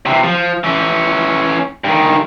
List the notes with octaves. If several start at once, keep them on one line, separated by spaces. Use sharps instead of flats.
C3 E3
F3
E3 C#4
G2 D#3